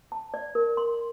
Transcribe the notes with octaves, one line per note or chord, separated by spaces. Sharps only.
A5
D5
A#4
C6